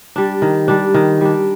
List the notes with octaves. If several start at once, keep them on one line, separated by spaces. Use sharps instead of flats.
G3 D4
D#3
G3 D4
D#3
G3 D4